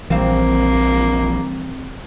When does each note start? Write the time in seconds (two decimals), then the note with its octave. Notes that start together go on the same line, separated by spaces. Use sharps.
0.10 A#1 E3 G3 A#3 C4 F5